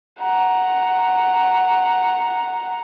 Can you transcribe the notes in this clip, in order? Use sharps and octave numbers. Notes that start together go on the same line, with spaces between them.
F#5 A#5